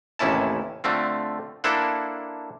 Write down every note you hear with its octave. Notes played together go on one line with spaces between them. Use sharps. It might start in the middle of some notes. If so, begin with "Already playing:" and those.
A1 D#2 C3 C#4 E4 A5
D3 A3 C4 F4
A#3 D4 E4 A4 C5 F#5